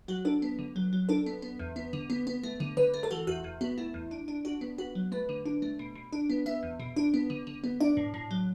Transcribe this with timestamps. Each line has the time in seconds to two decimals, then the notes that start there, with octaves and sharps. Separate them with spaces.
0.08 F#3 F#4
0.25 D4 A4
0.42 B3
0.59 D3
0.76 F#3
0.93 F#3
1.09 D4 A4
1.26 B3
1.42 B3
1.59 E2
1.76 B3
1.93 D3
2.10 B3
2.27 B3
2.43 A3
2.60 D3
2.77 D3 B4
2.94 A3
3.03 A4
3.11 E3 F#4
3.27 E2 F#4
3.44 E2
3.61 B3 F#4
3.78 A3 E4
3.94 E2
4.11 D4
4.28 D4
4.45 D4 F#4
4.61 B3
4.78 B3 F#4
4.95 F#3
5.12 A3 B4
5.29 D3
5.46 D4
5.62 A3
5.79 B2
5.96 B2
6.12 D4
6.30 B3
6.46 B3 E5
6.63 E2
6.80 B2
6.96 D4
7.14 B3
7.30 D3
7.47 D3
7.64 B3
7.80 D4 D5
7.97 A2
8.14 A2
8.31 F#3